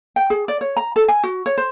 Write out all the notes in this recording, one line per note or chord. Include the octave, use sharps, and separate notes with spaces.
G5
G#4
D5
C#5
A#5
A4
G#5
F#4
C#5
C5